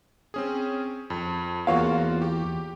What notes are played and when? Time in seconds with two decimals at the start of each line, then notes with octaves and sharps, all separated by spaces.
0.34 C4 C#4 G#4
1.10 F2
1.67 E2 A#3 F4 F#4 C#5 F5
2.22 G4